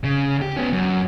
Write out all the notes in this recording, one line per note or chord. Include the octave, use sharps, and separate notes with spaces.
C#3
G4
B3 C#4
F#2